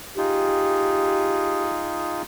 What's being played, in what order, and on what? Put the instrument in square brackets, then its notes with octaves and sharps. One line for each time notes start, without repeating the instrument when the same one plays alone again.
[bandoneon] D#4 F4 G#4 [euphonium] G4